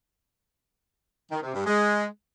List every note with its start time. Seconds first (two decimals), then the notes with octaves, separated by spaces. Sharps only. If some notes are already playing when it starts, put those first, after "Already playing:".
1.32 D#3
1.43 C3
1.54 G2
1.66 G#3